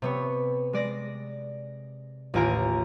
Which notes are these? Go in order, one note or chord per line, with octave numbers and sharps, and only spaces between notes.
C3 B3 C#5
G#3 D5 A#6
A1 D#2 F4 G#5 A#5 D7